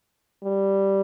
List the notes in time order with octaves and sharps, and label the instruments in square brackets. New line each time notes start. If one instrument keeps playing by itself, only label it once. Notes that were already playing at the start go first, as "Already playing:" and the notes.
[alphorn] G3